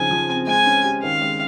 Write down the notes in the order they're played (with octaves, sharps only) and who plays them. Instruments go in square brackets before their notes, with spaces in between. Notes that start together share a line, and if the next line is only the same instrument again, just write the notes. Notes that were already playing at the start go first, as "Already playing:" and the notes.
Already playing: [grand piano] C#3 F3 C4 D#4 [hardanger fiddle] G#5
[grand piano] F3
C4
[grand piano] G#3 [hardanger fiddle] G#5
[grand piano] C#4
G4
[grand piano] D#3 [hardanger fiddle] F5
[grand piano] G#3